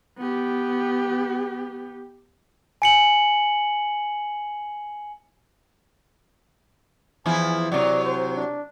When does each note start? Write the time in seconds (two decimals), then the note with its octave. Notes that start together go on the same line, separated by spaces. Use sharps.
0.18 B3 G4
2.82 G#5 C#7 F#7
7.26 E2 F3 E4 G#5
7.72 C3 F#3 D5
8.04 C5
8.36 D4